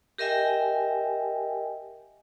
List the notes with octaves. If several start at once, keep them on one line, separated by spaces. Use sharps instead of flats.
G4 A#4 D#5 E5 G5 G#5